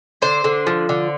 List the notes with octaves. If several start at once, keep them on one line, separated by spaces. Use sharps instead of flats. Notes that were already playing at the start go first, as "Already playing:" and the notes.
D3 C5
D3
F3
D3